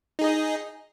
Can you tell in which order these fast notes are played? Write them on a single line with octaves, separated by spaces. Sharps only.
D#4 G#4 D#5